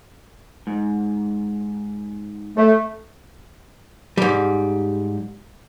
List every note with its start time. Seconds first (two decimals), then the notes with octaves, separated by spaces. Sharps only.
0.67 G#2
2.57 A3
4.17 G#2 G3